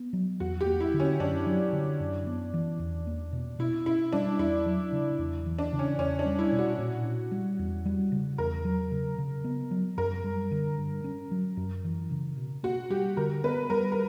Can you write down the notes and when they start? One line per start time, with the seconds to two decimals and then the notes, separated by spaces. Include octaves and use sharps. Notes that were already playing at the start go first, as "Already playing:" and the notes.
Already playing: B3
0.13 F#3
0.40 E2 F#4
0.61 G4
0.66 A#3
0.81 E4
0.94 D3
1.00 C#4
1.20 F#2 D4
1.46 F#3
1.73 D3
2.00 F#2
2.27 B3
2.54 E3
2.79 E2
3.07 A#3
3.33 B2
3.59 B2 E4
3.86 C#4 E4
4.12 G3 D4
4.39 E2 E4
4.66 F#3
4.92 C#3
5.18 E2
5.46 E3
5.59 D4
5.73 C#3
5.79 C#4
5.98 E2 C#4
6.19 D4
6.26 G3
6.39 E4
6.52 B2
6.59 F#4
6.78 A#2
7.05 C#4
7.31 G3
7.59 E2
7.86 G3
8.12 C#3
8.38 E2 A#4
8.65 F#3
8.91 C#3
9.18 C#3
9.44 B3
9.71 F#3
9.97 F#2 A#4
10.24 G3
10.51 D3
10.78 G2
11.04 C#4
11.31 F#3
11.57 F#2
11.84 E3
12.11 C#3
12.37 B2
12.63 A#3 F#4
12.90 G3 G4
13.17 D3 A#4
13.44 B3 B4
13.70 G3 A#4
13.92 A#4